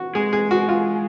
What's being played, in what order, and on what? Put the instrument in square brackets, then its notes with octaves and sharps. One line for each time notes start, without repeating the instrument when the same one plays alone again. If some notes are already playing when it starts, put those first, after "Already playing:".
Already playing: [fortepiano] F#4
[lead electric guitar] G#3 [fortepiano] G#4
[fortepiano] G#4
F#4
F4